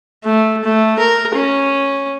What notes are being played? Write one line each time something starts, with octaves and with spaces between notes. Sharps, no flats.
A3
A3
A#4
C#4